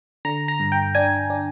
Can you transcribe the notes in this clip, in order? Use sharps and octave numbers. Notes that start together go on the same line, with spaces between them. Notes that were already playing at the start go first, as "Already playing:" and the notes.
D3 A#5
A#5
G2
G5
D4 G#5
D4